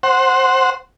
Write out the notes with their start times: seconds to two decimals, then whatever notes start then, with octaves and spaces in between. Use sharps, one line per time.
0.03 C5 F#5